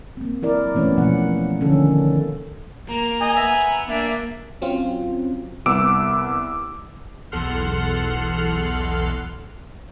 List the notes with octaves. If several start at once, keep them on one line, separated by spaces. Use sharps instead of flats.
A#3 C4
F#3 E4 A#4 D5
E3 A3 B3 C#4 C#5
B2 F3 A#3 F#5
D3 D#3 F3 C#4 A4
A#3 A#5
D#5 G#5
B3 E5
A#3 D4 E5
F#3 C4 C#4 F4
C2 B3 D6 E6 D7
B1 E2 A4 F#5 C6 F6